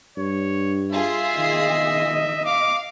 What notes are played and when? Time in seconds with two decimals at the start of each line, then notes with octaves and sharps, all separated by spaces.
0.17 G2 C#5
0.92 F4 G#4 E5 C7
1.38 D#3 D#5
2.45 F5 D6